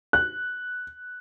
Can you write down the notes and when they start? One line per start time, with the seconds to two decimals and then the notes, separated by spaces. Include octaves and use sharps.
0.13 F#6